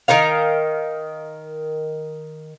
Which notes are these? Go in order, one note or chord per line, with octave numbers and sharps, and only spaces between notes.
D#3 D#4 A#4 F5